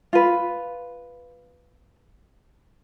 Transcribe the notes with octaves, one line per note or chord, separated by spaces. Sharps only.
F4 B4